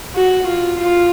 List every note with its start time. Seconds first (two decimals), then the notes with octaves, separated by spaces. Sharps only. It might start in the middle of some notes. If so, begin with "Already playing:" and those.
0.15 F#4
0.46 F4
0.78 F4